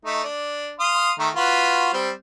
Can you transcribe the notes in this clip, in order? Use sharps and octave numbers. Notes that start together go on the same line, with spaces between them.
A3 D#4
D4
F5 C6 D#6
D#3 A3 A#5
F4 F#4 B4
G3 C4